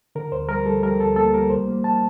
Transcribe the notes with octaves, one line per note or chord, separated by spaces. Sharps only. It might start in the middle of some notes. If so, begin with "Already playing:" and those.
D3 A#4
D2 C5
G3 A#4
G3 A4
G3 A#4
D2 A4
A#3 A4
G3 A#4
C2 C5
A#3
A#3 A5